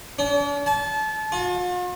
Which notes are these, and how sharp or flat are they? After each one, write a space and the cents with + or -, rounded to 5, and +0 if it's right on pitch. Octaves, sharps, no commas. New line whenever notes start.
D4 -45
A5 -30
F4 +45